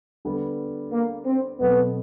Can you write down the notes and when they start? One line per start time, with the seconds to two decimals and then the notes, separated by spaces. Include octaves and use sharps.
0.25 D3 G3 B3
0.92 A#3
1.26 C4
1.60 B2 F#3 A3 B3 C4